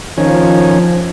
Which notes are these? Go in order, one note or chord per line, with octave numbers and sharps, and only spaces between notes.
D#3 F3 C#4